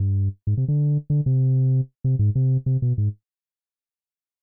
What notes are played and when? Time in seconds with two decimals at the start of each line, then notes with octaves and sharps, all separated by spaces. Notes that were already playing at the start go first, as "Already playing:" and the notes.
Already playing: G2
0.47 G#2
0.57 C3
0.68 D3
1.10 D3
1.26 C3
2.04 C3
2.19 G#2
2.35 C3
2.66 C3
2.82 B2
2.98 G#2